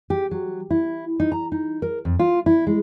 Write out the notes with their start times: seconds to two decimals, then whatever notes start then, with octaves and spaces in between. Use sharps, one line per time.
0.10 G4
0.31 F#3
0.71 E4
1.20 D#4
1.32 A#5
1.52 D#4
1.82 A#4
2.05 F2
2.19 F4
2.46 E4
2.67 G#3